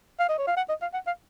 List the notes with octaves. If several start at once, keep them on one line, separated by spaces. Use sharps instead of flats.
F5
D#5
C#5
F5
F#5
D#5
F5
F#5
F5